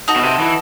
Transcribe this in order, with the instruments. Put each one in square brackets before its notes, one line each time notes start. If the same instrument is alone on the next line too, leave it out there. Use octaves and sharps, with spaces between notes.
[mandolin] D#4 F#4 A4
[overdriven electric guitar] B2
C3
E3